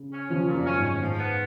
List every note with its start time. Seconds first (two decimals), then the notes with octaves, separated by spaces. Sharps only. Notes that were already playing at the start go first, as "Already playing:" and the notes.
Already playing: C#3
0.12 C#4
0.30 C#3 F3 C#4
0.47 A#2
0.53 F#2
0.66 C#4
0.77 G#2
0.83 C#4
1.01 G#2 F3
1.19 B3